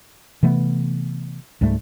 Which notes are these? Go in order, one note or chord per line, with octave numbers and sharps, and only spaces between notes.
C3 E3 A3 B3
C#2 G#2 G3 A3